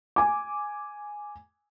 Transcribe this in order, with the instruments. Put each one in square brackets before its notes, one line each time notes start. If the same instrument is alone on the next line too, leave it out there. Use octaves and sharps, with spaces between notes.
[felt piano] G#5 D6